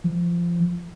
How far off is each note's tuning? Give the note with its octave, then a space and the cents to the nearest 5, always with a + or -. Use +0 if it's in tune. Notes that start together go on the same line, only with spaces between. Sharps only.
F3 -20